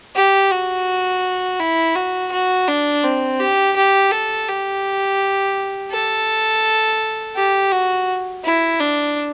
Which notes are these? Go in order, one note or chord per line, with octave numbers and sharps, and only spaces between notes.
G4
F#4
E4
F#4
F#4
D4
C4
G4
G4
A4
G4
A4
G4
F#4
E4
D4